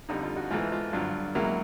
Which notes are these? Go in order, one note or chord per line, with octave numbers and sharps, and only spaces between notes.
F2 D3 G3 D#4
F4
F#4
G#2 E3 A3 F4
F4
G2 D3 F#3 F4
C#2 C#3 F#3 A#3 E4